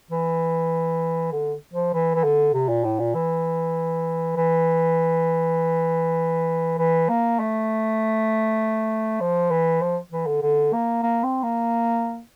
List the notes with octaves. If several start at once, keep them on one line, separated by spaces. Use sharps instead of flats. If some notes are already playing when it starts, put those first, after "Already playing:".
E3
D3
F3
E3
E3
D3
C3
A#2
A2
A#2
E3
E3
E3
A#3
A3
F3
E3
F3
E3
D3
D3
A#3
A#3
C4
A#3